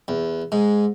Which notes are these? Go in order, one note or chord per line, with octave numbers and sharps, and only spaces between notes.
E2
G#2